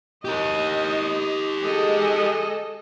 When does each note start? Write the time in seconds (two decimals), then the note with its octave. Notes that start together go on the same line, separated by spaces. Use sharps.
0.25 G4 A#4 D#5
1.61 G#3 G#4 A4 D#5